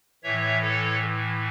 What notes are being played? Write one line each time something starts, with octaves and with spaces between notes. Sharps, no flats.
A2 E3 C#5 E5
A4 C#5